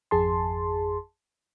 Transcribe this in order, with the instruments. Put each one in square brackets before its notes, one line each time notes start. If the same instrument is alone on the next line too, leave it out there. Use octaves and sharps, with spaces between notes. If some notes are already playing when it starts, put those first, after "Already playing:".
[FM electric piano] G#1 F2 G#4 A5 C6